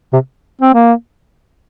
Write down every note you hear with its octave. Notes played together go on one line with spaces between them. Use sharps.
C3
C4
A#3